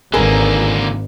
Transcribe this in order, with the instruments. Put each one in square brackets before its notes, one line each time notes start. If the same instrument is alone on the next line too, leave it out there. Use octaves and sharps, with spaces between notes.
[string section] G#1 [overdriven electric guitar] D3 A#3 [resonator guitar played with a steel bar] G#4 A#4 B4